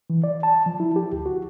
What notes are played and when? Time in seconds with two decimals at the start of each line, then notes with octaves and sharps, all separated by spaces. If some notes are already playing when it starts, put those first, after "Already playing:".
0.10 E3
0.24 D5
0.43 A5
0.66 F3
0.80 E4
0.96 G4
1.12 D2
1.26 F#4